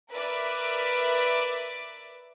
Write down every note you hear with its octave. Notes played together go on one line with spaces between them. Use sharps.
A#4 B4 D5 E5 D6